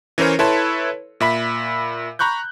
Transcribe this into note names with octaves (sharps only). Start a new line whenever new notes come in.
E3 C#4 A#4 C5 C#5
E4 A4 B4 C#5 A5 C6
A#2 E5 B5 B6
A#5 B5 C#6 F#6 G6